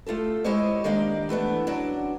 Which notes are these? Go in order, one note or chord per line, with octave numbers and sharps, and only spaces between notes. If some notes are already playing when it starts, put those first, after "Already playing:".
A3 F4 G4 A4
G#3 E4 G4 C5 C#5 D#5
D#3 G#3 A#3 D4 G4 F5
E3 A3 B3 D4
F#3 C#4 D4